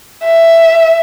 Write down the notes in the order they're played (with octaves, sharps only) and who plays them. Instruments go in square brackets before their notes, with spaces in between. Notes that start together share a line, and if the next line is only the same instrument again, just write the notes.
[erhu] E5